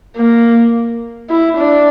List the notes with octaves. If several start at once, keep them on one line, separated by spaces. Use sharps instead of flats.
A#3
E4
D4